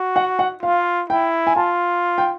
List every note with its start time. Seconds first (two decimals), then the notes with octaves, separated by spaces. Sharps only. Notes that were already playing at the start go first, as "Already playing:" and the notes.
Already playing: F#4
0.16 F#5
0.39 F#5
0.63 F4 F5
1.10 E4 G5
1.47 G#5
1.56 F4 A5
2.18 G5